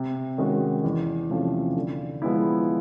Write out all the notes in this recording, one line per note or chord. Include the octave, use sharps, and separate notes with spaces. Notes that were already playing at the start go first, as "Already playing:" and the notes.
Already playing: C3
D#3 G#3 C#4 F#4
E2
C3 F3 A3 C#4
D3
F3 G#3 B3 E4